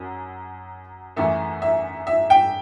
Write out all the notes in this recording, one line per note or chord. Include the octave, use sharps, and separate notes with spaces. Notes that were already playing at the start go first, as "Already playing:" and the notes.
Already playing: F#2 F#3
F#2 E3 A3 E5
E5
E5
G5